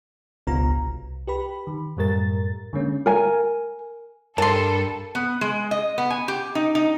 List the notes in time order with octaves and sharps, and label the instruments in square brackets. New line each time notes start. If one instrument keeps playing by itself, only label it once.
[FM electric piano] G#1 C#2 B2 B3 F4 A#5
C2
G4 B4 B5
D#3
F#2 A2 G3 A3 A#4 A6
D3 G#3 A#3 C#4
[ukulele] A#4 G#5
[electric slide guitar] G2 [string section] A4 [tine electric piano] A#4 [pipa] A5 C6
[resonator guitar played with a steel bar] B3
G#3
D#5
B3
G#5
G4
D#4
D#4